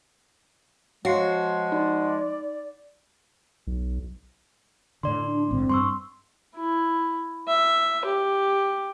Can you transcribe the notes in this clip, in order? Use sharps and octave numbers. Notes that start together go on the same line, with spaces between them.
F3 G#3 F#4 C#5 F5 C7
D#4 D5
B1
A2 D3 D5 C6
D4
A1 G#2 D3 C4
G2 C6 C#6 E6
E4
E5
G4